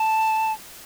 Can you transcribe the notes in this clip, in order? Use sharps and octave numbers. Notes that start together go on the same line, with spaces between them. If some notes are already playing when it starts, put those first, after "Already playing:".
Already playing: A5